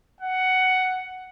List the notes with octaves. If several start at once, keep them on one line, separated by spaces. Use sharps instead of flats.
F#5